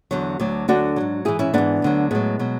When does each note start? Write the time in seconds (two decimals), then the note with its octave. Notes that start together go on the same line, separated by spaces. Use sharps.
0.11 E2 D3 F#3
0.40 D2 D3 F#3
0.68 D2 D3 F#3 D4 F#4
0.96 G#2 F#3
1.25 G#2 E3 E4 G#4
1.39 C#4 E4
1.53 G#2 E3 B3 D4
1.82 D2 D3 F#3
2.11 A2 F#3 G#3 B3
2.39 B2 F#3